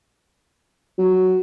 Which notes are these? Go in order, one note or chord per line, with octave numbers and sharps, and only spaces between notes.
F#3